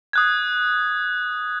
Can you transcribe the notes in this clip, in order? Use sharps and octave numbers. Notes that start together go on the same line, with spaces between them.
D#6 F#6 G#6